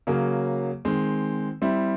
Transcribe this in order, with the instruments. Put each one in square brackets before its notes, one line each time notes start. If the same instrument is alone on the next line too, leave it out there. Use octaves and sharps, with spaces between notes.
[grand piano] C#3 F#3 A#3
D#3 G#3 C4
G3 C4 E4